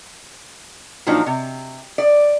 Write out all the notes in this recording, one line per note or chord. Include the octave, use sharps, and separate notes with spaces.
A#2 F3 F#3 D4 D#4
C3
D5